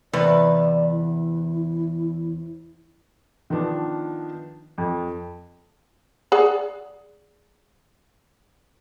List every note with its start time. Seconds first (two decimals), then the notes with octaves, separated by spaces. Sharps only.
0.13 E2 C3 B4 D5
0.92 E4
3.50 D#3 F3 B3 D4
4.78 F2
6.32 G#4 D5 F#5